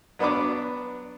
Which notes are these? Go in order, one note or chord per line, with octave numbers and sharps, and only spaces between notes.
F#3 B3 D4 B4 B5 D6